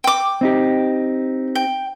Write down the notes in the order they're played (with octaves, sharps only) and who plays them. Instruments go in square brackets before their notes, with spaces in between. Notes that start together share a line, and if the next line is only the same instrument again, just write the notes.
[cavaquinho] G5 D6
[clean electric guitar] C4 D#4 G4
[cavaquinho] G5